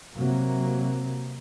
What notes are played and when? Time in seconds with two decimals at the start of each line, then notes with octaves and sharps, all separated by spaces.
0.16 C3 F#3 A#3